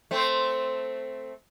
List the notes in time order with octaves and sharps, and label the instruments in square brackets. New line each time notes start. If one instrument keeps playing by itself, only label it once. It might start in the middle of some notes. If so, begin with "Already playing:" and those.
[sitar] A3 C4